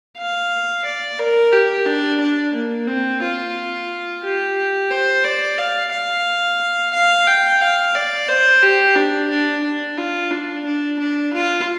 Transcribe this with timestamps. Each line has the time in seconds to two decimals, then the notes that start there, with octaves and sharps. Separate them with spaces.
0.17 F5
0.85 D5
1.19 A#4
1.52 G4
1.86 D4
2.20 D4
2.54 A#3
2.88 C4
3.22 F4
4.23 G4
4.90 C5
5.24 D5
5.58 F5
5.91 F5
6.93 F5
7.27 G5
7.61 F5
7.95 D5
8.28 C5
8.63 G4
8.96 D4
9.30 D4
9.64 D4
9.97 F4
10.31 D4
10.65 D4
10.99 D4
11.33 F4